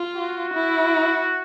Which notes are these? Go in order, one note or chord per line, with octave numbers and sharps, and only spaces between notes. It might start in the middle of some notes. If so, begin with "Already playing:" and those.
Already playing: F4
F#4
E4